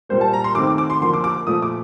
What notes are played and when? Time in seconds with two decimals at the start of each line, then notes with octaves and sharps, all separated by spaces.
0.09 A#2 G3 A#3 C5
0.21 A5
0.33 A#5
0.44 C6
0.55 D#3 A3 C4 D6
0.67 D6
0.78 D6
0.90 C6
1.01 D3 F3 A#3 C6
1.13 D6
1.24 D6
1.47 A#2 F3 A3 D#6
1.62 D6